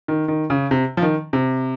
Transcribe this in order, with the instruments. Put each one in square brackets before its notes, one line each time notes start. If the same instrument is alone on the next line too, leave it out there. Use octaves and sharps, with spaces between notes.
[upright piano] D#3
D#3
C#3
C3
F3
D#3
C3